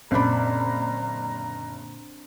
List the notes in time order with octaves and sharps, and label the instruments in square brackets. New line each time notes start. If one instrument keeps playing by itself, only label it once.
[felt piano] F#1 B5 [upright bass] A#2 D3 [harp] C4 D4 [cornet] A#5